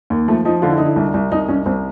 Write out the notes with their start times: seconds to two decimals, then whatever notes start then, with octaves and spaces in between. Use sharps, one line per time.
0.10 D#2
0.28 F3 A3
0.45 F3 D#4
0.62 D3 F4
0.70 E4
0.78 D3 D#4
0.86 E4
0.96 C2
1.14 C2
1.32 C2 D#4
1.48 C2 C#4
1.66 C2 C4